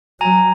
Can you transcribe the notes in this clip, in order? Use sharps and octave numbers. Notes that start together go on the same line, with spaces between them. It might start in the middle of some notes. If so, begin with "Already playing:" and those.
F#3 G#5 A#5